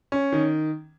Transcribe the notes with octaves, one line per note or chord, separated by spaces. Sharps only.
C#4
D#3